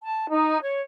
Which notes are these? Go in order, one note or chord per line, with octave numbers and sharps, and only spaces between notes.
A5
D#4
C#5